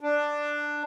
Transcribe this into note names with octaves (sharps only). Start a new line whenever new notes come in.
D4